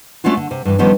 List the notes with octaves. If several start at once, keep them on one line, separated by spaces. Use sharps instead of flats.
A3 C#4 D4 F4 F#4
D3
C3
G2 E3
D3 D#3 F3 G3 B3 C#4